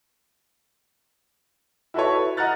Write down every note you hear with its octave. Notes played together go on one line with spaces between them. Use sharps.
E4 F#4 A4 B4 C#5
D#5 F#5 A#5 F6 F#6 A6